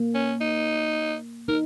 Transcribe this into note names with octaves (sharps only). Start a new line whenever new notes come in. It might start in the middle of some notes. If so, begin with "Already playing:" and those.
Already playing: A#3
C#4
D#4
D#4 A#4